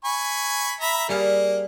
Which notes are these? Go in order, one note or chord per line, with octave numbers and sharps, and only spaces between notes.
G#5 B5 C#6
E5 A#5 B5
G3 A#3 G#4 F5